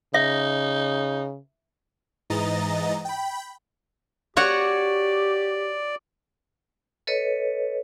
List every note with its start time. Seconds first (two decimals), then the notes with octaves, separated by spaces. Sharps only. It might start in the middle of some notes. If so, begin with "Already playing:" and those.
0.14 C#3 D#4 E5
2.30 G#2 E3 D#5 A#5 A6
3.05 G5 B5
4.37 F#4 G4 C#5 D5 F#5
7.07 A4 B4 C#5 D#5